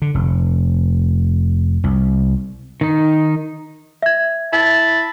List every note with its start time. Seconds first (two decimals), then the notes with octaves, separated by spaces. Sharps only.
0.02 D3
0.15 F1
1.84 C2
2.81 D#3 D#4
4.02 E5 G#6
4.53 E4 A5